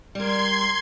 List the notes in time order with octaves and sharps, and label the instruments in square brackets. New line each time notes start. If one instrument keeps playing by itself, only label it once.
[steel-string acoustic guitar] G3 A#4 [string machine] C6 G#6